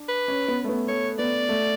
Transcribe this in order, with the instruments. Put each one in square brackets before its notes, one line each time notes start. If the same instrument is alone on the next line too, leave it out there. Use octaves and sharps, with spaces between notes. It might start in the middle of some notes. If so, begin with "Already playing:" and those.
Already playing: [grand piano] D4
[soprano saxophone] B4
[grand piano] C#4
B3
A3
B3
[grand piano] A3 [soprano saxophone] C#5
[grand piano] B3 [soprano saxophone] D5
[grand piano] A3